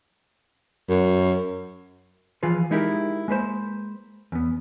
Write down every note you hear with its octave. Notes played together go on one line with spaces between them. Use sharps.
F#2
E3 F3 F4 G#4 B4
G#3 D#4 E4 G4 G#4 A#4
G#3 A#3 B4 C5
E2 B3